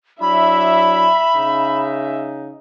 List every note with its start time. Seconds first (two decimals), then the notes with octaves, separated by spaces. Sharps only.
0.21 F#3 D4 E4 E5 B5
1.35 C#3 D#4